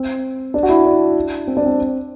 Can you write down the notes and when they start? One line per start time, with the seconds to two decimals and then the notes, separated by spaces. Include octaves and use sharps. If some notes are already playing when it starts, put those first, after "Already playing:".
Already playing: C4
0.54 D4
0.63 F#4
0.69 E4
0.85 D4
1.47 C4
1.57 D4
1.65 C4